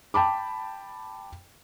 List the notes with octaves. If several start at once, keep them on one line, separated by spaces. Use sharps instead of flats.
G5 A5 B5 D6